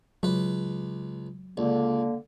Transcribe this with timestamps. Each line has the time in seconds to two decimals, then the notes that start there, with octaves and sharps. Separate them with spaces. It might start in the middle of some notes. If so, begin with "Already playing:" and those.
0.23 C#2 F#3 B4
1.57 C#2 D3 A#3